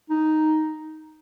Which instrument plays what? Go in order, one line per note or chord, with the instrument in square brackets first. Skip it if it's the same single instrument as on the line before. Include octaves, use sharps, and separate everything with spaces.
[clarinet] D#4